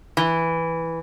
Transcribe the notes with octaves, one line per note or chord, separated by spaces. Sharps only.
E3